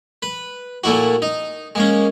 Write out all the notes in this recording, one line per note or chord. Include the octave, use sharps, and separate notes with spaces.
B4
A#2 A3 A#3 E4 F#4
D#4
G#3 A#3 C#4